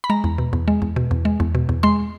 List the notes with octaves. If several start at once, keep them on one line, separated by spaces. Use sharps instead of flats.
B5
G#3 A#5
E2
B2
E2
G#3
E2
B2
E2
G#3
E2
B2
E2
G#3 C6